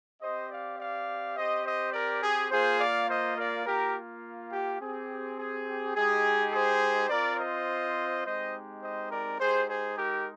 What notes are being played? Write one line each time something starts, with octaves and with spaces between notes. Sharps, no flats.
C4 G4 C5 D#5
D5 F5
D5 F5
C4 G4 C5 D#5
C5 D#5
A#4 D5
G#4
A#3 F4 G#4 C5
D5 F5
C5 D#5
A#4 D5
A#3 F4 G4 A#4
G4
C4 G4 G#4
G#4
G#3 D#4 G4 G#4
G#4 C5
C4 F4 A#4 D5
C5 D#5
G#3 C4 D#4 G4 C5 D#5
C5 D#5
A#4 D5
G#3 D#4 G4 G#4 C5
G#4 C5
G4 A#4